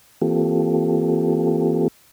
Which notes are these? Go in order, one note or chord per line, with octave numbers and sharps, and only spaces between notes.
E3 A#3 C4 F4 G4 A4